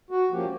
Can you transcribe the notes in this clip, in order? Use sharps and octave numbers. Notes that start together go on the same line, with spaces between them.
F#4
F3 A#3 C#4 G4